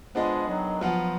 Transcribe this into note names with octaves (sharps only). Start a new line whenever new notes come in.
F3 G#3 B3 D4 G#4 D#5
D#3 F#3
F3 F#3 B3 F4